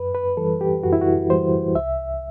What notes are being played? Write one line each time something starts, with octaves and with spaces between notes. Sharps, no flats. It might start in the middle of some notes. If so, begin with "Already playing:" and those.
Already playing: F#2 B4
B4
E3 G3 A4
G4
F#2 F#4
E4
F#4
E3 G3 C5
C2 E5